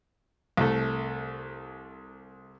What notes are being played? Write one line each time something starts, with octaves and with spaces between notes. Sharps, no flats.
C2 A3